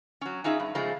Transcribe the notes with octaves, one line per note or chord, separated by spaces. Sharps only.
F#3 C#4
C#4 D#4 F4 G#4 E5
G2
C#3 F3 G#3 A3 G#4